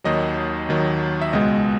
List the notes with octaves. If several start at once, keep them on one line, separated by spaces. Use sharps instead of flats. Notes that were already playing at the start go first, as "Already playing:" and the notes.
D#2 D#3 F#3 D#5
D#2 D#3 F#3
E5
C#2 B2 G#3 D#5